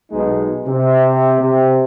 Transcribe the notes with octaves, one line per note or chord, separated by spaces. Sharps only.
B1 B2 G#3 D#4
C3
C3